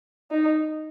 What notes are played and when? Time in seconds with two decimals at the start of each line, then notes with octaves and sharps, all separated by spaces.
0.31 D#4